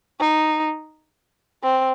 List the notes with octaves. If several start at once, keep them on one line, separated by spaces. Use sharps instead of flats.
D#4
C4